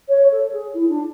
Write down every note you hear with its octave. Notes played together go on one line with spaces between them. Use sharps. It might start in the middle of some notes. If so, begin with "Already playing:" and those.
C#5
A4
G#4
E4
D4